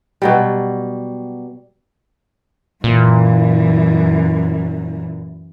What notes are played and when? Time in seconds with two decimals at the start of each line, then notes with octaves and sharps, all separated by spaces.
0.22 B2 F#3 G3
2.84 F#2 A#2 E3